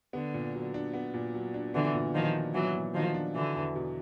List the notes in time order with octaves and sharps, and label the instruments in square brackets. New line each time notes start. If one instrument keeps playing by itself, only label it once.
[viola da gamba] D3 [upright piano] B3
[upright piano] A#2
F#3
D4
B3
A#2
F#3
D4
[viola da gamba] D3 E3 [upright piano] B3
[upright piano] A#2
[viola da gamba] D#3 F3 [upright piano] F#3
[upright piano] D4
[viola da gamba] E3 F#3 [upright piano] B3
[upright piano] A#2
[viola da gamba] D#3 F3 [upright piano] F#3
[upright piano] D4
[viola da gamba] D3 E3 [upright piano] F#3
[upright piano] E2
B2